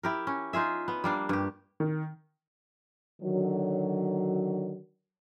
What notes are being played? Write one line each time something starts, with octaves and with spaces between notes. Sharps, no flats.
E4 G4 A#4
C#4
D#4 F4 G#4 E5
B3
G3 A#3 D4
G2 G4
D#3
D3 D#3 F#3